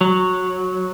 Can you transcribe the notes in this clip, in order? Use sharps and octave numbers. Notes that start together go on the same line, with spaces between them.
F#3